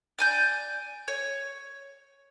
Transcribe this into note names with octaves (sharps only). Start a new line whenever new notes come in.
D5 G#5 G6
C#5